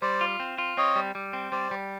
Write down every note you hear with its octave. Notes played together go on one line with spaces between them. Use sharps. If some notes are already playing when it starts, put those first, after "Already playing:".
G3 C5 D5
F4
C4
F4
C4 C#5 D#5
G3
G3
C4
G3 C5 D5
G3